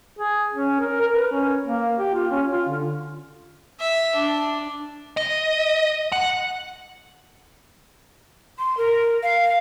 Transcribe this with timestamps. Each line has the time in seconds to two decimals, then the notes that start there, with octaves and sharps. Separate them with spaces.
0.19 G#4
0.54 C#4
0.80 A#4
1.01 A#4
1.15 B4
1.32 C#4
1.66 A#3
1.98 G4
2.14 F4
2.31 C#4
2.51 F4
2.68 D3
3.80 E5
4.15 D4
5.17 D#5
6.12 F#5
8.59 C6
8.77 A#4
9.23 F5